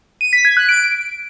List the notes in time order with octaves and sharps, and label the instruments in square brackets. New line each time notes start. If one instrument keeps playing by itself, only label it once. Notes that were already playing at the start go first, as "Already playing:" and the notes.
[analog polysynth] D#7
B6
G#6
F#6
D7